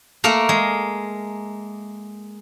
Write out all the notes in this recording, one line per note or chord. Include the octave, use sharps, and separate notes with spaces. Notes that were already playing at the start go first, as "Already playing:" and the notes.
A3 A#3 A#4
G#3